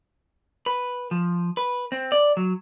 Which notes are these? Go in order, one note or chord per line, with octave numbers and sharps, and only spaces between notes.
B4
F3
B4
C4
D5
F#3